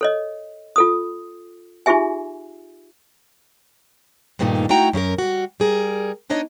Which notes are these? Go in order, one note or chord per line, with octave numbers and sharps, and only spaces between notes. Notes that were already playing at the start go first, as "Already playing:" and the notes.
A4 C#5 D#5
F4 A4 D#6
D#4 F4 G4 G#4 E5 G#5
G2 A#2 D#3 A3 D4 D#4
A3 D#4 E4 F#4 G5 A#5
F#2 C#4 F#4 A#4
G3 F#4
G3 G#4 A#4
B3 D4 D#4 C#5 D#5